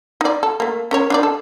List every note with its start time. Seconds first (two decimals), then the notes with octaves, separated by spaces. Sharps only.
0.21 D#4 D5
0.43 A4
0.60 A3 A#3
0.91 C#4 A#4 C#5
1.10 D4 D#4 D5
1.23 A4